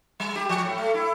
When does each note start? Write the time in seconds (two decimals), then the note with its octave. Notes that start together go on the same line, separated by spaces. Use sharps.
0.20 G3
0.36 G4
0.49 F3
0.64 A2
0.78 A3
0.94 E4